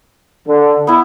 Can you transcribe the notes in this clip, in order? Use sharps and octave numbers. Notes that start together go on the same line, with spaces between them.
D3
B3 E4